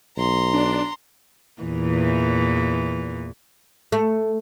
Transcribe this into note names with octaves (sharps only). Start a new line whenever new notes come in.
B1 A#5 C6
D4
E2 A#2 E3
A3